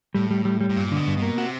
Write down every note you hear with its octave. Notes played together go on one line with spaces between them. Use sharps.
A2 G3
G3
G3
G3
A2
G2 A#2
B2 D3
G2
B2
A#3
C3 F#4